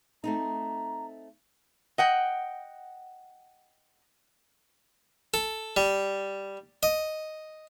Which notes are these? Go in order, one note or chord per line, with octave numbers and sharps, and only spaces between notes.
A3 C4 D#4 A#5
D#5 F#5 G5
A4
G3
D#5